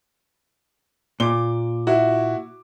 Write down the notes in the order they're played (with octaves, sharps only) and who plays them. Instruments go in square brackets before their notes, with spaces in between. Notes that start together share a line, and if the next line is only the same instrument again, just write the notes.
[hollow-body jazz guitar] A#2 [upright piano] D6 G7
[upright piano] E4 F#4